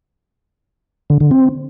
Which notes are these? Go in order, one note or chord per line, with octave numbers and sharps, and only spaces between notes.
D3
D3
C4